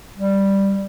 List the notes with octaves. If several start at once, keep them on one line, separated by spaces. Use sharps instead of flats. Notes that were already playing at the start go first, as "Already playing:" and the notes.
G3